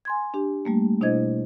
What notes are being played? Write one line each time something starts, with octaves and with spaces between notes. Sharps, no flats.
G#5 C6 G#6
D4 G4
G3 A3 A#3
B2 D4 E4 C5 D#5 G#6